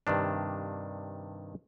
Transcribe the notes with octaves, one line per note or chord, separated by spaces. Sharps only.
G2 C3 D#3 D4